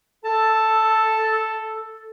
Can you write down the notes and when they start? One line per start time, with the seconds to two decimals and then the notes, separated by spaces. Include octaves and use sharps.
0.25 A4 A5